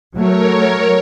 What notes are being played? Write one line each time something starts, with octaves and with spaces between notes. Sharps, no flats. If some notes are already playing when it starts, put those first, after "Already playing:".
F#3 A3 A#4 C#5